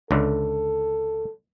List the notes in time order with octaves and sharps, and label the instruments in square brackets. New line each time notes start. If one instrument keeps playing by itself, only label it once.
[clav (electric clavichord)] C#2 D3 [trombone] A4